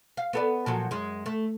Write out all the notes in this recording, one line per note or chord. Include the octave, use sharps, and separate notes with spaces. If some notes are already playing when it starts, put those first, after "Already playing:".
F5
B3 A4 D5
A#2 F3 F#3
F#2 G#3
A3